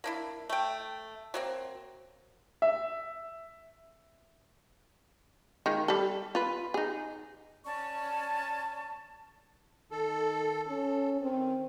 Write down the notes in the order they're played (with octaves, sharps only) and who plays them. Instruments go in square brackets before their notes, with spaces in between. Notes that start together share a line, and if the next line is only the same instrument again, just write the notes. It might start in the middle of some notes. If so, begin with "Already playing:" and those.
[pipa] A#3 D4 E4
A3 G5
F#3 A#3 C4
[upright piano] E5
[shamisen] D#3 G#3 F4
G3 A4
F4 B4
D#4 G#4
[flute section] C#4 D5 A5 C#6
[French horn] D#3 [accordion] A4
[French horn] C#4 [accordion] A4
[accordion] D#3 [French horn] C4